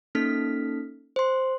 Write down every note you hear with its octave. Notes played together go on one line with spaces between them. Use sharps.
A#3 C#4 D#4 A4 F6 B6
C5 C6